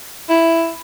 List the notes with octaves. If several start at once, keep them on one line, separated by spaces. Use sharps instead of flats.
E4